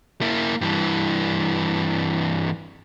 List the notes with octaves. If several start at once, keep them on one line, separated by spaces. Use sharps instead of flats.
A#3 E4
G2 E3